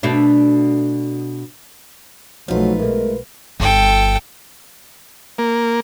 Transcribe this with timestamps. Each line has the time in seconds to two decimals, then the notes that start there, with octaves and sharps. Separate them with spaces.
0.03 B2 A3 D4
2.48 B1 F3 F#3 A3 D#4 F4 B4
2.80 B2 G#3 A3 A#4
3.60 G1 A4 G5
5.38 A#3